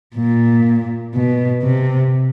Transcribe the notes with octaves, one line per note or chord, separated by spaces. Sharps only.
A#2
B2
C3